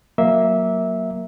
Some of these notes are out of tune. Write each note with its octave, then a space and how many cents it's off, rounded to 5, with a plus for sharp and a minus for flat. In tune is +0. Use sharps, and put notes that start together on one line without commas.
F#3 +0 A#3 +0 E5 -15